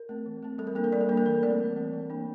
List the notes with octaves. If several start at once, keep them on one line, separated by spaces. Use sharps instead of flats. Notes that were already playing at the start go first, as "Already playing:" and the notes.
Already playing: A#4
A3 C4
E3
A3 C4
G3 A4
A#4
A#3 D4 A4
A#4
G3 D5
A4
A#3 D4 A#4
A4
E3 A#4
A3 C4 D5
E3
A3 C4
E3
A#3 D4